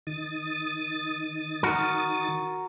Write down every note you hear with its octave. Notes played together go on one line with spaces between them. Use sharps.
D#3 D#6 A6
F#4 A#4